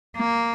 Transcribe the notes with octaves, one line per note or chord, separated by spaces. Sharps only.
A#3